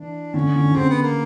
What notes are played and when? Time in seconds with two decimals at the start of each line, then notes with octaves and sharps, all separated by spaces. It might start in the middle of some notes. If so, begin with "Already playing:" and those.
Already playing: E3 D4
0.34 D3 C#4
0.56 D3
0.71 D3
0.75 C#3 C4
0.90 B3
1.03 A#3